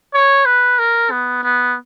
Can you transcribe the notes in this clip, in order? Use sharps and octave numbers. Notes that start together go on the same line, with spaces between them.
C#5
B4
A#4
B3
B3